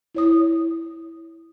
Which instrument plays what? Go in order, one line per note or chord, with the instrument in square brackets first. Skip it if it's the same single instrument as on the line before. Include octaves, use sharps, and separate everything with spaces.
[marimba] E4 C#5 D#6